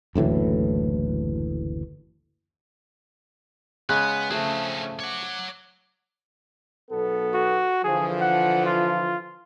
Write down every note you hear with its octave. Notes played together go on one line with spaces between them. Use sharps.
F#1 D2 A2 E3
C#3 G#3 B3 F#6
C#3 F3 A3 C4 C#4 G#4
C#5 F#5 D6
B1 B3 A4
F#4
D3 E3 F3 G#4
F#5
F4